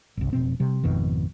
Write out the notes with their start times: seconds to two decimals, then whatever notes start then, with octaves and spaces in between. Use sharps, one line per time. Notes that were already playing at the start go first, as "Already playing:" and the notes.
0.17 G1 C2
0.33 F1 B2 C4
0.60 C3 G3
0.83 G#1 F2 B2 D#3